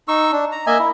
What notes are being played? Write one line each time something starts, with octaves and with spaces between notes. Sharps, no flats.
D#4 C#6 E6
D4
A#5
A#3 D#5 E5 G#5
E4